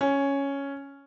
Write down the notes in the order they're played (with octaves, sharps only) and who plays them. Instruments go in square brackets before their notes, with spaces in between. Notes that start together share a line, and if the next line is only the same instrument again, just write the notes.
[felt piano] C#4